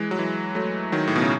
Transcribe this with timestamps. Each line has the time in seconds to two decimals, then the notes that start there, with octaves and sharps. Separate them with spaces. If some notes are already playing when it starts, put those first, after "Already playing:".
Already playing: E3 G#3
0.11 F#3
0.18 E3 G#3
0.55 F#3 A3
0.92 D#3 F#3
1.07 A2
1.16 B2
1.22 C#3